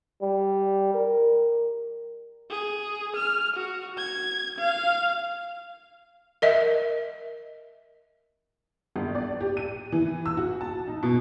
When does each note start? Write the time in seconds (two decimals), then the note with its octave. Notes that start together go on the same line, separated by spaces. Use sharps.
0.22 G3
0.94 A#4
2.50 G#4
3.16 F6
3.56 F#4
3.98 G#6
4.59 F5
6.42 A#4 D#5 E5
8.96 G1
9.15 D5
9.41 G4
9.57 D#7
9.92 E3
10.26 E6
10.37 F#4
10.61 A5
10.88 D#4
11.03 B2